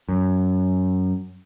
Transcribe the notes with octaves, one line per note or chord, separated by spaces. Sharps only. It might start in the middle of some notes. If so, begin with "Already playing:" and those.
F#2